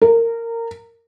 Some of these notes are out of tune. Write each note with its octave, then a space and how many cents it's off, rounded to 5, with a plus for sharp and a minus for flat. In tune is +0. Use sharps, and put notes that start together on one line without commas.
A#4 -20